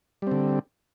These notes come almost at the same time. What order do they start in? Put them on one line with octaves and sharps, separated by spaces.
G3 C4 D3